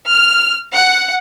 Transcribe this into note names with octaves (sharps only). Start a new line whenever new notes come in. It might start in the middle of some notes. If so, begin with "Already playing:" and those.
F6
F#5